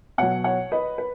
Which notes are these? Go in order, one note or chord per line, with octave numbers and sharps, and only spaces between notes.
B2 F#3 C#5 F#5
C#5 F#5
B4 D#5
B4